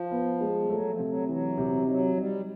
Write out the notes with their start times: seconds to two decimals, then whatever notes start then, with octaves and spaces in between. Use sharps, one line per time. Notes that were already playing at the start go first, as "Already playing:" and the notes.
Already playing: F3
0.11 B3
0.41 G#3
0.60 G3
0.70 F#3 A3
0.90 F3
0.99 C3
1.05 F3
1.08 F#3
1.28 E3 F#3
1.58 C3
1.87 F#3 D#4
2.16 G3 D#4